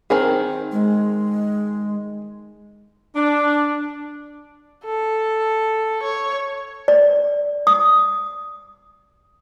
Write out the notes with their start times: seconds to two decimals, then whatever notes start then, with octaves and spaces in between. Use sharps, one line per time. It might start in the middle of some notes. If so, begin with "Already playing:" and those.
0.10 D#3 C4 G#4
0.72 G#3
3.16 D4
4.85 A4
6.03 C#5
6.88 D5
7.67 D#6